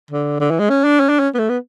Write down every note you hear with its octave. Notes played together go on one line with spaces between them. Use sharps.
D3
D3
E3
G#3
C#4
D4
C#4
D4
C#4
B3
A3
B3